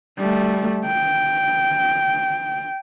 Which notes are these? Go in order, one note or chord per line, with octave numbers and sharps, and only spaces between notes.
G3 A3
G5